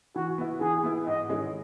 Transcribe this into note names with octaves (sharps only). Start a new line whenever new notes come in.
E3 F#4
B3 E4
E3 G#4
B3 E4
G#2 D#5
D#3 G#3 C#4 E4